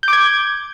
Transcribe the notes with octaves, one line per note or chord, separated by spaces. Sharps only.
D6 G6 G#6